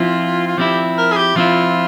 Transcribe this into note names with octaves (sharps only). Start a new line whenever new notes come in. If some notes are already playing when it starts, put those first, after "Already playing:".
Already playing: F3 C4 E4 F4
F4
F3 C4 E4 G4
A#4
G#4
G4
F3 C4 E4 F4